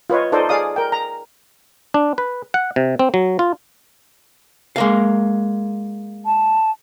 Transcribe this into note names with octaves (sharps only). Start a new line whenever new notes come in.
F4 B4 C#5 D#5
D#4 F4 A4 C5 D5 D#5
G#4 D5 F5 D#6
A#4 G5
A#5
D4
B4
F#5
C3
C4
F#3
F4
G#3 A#3 F5
A5